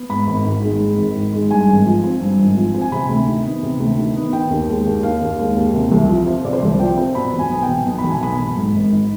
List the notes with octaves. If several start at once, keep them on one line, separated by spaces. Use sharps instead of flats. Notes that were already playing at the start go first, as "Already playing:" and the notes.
Already playing: B3
G#2 B5
G#1
D#3
G#3
G#2
G#1
D#3
G#3
G2 G#5
G#1
F3
C4
G2
G#1
F3
C4
G#5
C3 B5
D2
D#3
B3
C3
D2
D#3
B3
D#3 G5
D#2
G#3
D#2
D#3 F5
D#2
G#3
D#2
C3
C2
F3
C4
C3 D5
C5
C2 D5
F3 G5
C4
B2 B5
B1
G#5
B3
G5
B1
B2
B5
B1
G#5
B3 B5
B1
G#2
G#1
D#3